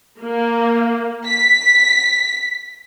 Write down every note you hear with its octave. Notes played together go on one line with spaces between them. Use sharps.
A#3
B6